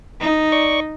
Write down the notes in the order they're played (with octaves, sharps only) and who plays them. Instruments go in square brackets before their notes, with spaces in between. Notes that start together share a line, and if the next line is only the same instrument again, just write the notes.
[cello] D#4
[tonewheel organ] D5 C#6